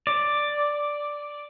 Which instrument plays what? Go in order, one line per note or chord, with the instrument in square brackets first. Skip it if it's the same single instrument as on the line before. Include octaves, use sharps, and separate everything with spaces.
[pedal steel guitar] D5